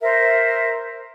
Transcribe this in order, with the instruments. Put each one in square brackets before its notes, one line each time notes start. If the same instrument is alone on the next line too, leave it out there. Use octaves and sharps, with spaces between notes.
[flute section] A#4 C5 E5